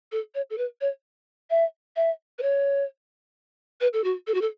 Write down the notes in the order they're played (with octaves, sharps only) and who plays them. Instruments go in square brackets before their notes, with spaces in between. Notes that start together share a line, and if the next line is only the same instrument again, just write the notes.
[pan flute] A4
C#5
A4
B4
C#5
E5
E5
B4
C#5
B4
A4
F#4
A4
F#4
A4